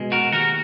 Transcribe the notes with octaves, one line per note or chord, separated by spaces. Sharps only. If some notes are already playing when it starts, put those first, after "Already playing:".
Already playing: B2 G#3
F#4 A#4
D#2 F#4 A#4